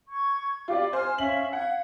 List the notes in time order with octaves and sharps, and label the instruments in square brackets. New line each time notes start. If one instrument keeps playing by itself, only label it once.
[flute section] C#6 G#6
[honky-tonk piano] F4 G4 D5 [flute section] B5 D6
[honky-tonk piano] C5 [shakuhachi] G#5 [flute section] F6
[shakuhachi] C#4 [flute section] E5 F5 [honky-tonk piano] F#7
[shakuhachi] F5 [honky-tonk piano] F#5 [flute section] G#6